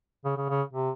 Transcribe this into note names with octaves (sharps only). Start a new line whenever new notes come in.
C#3
C#3
C#3
C3